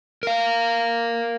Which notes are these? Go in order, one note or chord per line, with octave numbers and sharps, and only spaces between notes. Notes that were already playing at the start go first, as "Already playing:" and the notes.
A#4 F5